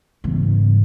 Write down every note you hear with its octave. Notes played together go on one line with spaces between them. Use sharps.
G#2 C#3 E3 G3 B3